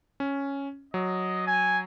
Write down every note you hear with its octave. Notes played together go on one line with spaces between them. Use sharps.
C#4
F#3 D#5
G#5